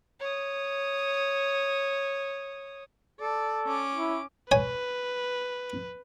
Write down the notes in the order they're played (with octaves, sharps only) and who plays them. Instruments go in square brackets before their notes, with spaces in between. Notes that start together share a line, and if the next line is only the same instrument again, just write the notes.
[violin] C#5 D#6
[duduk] A4 [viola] D5
[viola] C#4 D6
[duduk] E4
[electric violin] B4 [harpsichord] C#5 G#5